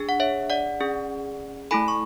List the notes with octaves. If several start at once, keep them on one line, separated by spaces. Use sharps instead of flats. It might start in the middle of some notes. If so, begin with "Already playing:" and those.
Already playing: D4 G#4
F#5
C#5 E5
D5 F#5
C#4 G#4
A3 E4 A4 G#5 B5
C#6